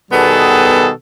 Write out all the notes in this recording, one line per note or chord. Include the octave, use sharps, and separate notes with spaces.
B2 D#3 G3 B3 G#4 A4